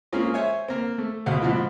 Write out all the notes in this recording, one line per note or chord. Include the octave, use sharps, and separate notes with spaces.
G#3 A#3 C4 C#4 F4 G#4
C5 C#5 E5 G#5
A#3 C4
A3
C#2 B2 C5 F5 F#5
G#2 B2 D3 F3 C4